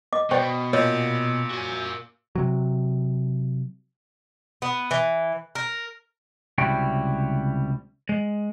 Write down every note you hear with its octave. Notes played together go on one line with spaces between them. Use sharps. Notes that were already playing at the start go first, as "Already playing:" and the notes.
D#5 D6
B2 B4 C5 D5 G5 C#6
A#2 C#5 D#5
F#4 G#5
C3 F#3
B3
E3
A#4
C#2 C3 G3 E4 F#4 G5
G#3